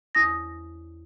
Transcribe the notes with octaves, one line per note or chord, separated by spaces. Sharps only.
E2 D#6 A#6